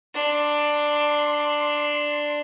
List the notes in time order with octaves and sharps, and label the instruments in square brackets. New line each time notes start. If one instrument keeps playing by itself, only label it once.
[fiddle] D4 C6